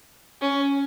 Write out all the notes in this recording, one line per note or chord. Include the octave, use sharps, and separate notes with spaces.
C#4